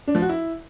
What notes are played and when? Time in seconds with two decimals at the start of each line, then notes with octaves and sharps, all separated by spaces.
0.07 D4
0.15 F3
0.22 F#4
0.29 E4